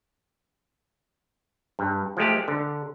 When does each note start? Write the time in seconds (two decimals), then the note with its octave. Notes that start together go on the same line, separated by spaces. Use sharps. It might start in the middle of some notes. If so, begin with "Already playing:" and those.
1.79 G2
2.17 F3 G#3 A3 G4
2.48 D3